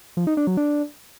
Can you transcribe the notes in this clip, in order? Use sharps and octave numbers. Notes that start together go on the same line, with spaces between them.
F3
D#4
D4
F#3
D4